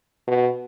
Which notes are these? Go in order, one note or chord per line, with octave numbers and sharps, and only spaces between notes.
B2